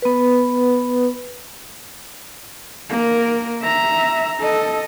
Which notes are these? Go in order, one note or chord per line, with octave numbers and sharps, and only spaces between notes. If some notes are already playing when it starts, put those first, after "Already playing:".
B3 B4
A#3 A#4
E5 A#5
A4 D#5